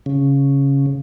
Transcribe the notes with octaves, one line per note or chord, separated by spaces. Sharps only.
C#3